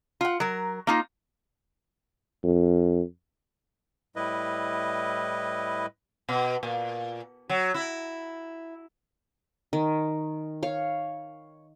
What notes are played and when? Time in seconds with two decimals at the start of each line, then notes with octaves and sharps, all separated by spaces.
0.21 F4 F#5
0.40 F#3 A#4
0.87 A#3 D#4 F4
2.44 F2
4.16 A2 G3 E4 B4 D#5
6.29 B2
6.63 A#2
7.49 F#3
7.74 E4
9.73 D#3
10.63 C#5 F5